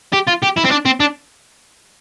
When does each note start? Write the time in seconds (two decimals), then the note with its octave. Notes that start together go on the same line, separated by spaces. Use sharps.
0.13 G4
0.27 F4
0.42 G4
0.57 E4
0.64 C4
0.71 D4
0.85 C4
1.00 D4